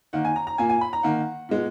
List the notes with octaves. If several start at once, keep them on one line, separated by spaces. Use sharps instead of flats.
D#3 A#3 F#5
G#5
A#5
A#5
A#2 A#3 G#5
G#5
B5
A#5
D#3 A#3 F#5
A#2 G#3 B3